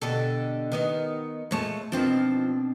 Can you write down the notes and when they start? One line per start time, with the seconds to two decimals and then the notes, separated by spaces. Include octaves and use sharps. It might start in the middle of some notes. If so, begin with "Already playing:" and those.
0.02 B2 D3 G4 A4
0.72 D#3 B3 D#4
1.51 A#2 G#3 A3 C#5 A5
1.92 B2 D#3 F3 C4 D4